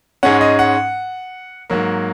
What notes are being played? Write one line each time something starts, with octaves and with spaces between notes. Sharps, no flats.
G#2 G#3 C#4 F#5
D#5
F#5
G#2 F#3 A#3